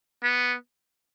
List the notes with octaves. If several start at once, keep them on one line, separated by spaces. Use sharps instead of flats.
B3